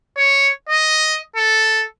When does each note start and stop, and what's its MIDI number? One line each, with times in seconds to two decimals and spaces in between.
0.17 0.48 73
0.69 1.19 75
1.36 1.83 69